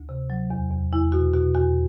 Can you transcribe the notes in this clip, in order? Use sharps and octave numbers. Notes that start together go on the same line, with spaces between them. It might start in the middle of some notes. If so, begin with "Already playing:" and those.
Already playing: D2
C3
F#3
E2
E2
E2 E4
B2 F#4
B2 F#4
E2 F#4